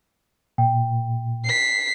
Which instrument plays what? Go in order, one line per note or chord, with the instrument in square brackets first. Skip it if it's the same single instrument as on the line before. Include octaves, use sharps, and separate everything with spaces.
[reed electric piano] A#2 [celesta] G5
[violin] B6 C7